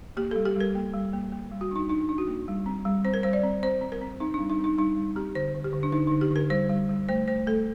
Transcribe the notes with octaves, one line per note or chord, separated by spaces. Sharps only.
A#3 G4
G3 A4
G4
G3 A#4
A#3
G3
A#3
A#3
G3
F#4
D4 D#4
D4 D#4
D4
F#4
A#3
G3
C4
G3
C4 C5
A#4
G3 C5
D5
C4
C4 C5
C4
A#4
C4
C4 D#4
G3 D4
D#4
C4
D#4
G3 D#4
G3
C4 G4
D3 C5
D3
G4
D3
D4
D3 D#4
D3 D#4
G4
D3 A#4
G3 C5
G3
G3
A3 C5
A3 C5
A3 A4